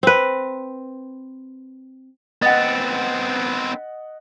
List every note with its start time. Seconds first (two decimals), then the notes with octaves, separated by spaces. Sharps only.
0.03 C4 B4
2.42 B3 C4 D#5 F#5 A6